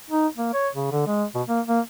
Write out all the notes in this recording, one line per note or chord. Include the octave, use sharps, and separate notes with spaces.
D#4
A#3
C#5
C#3
D3
G#3
B2
A#3
A#3